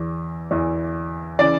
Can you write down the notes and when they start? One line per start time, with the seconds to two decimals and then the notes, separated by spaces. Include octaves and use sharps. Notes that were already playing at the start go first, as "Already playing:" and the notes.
Already playing: E2 E3
0.51 E2 E3
1.39 C#3 E3 D5